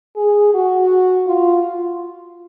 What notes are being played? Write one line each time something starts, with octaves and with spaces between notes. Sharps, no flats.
G#4
F#4
F4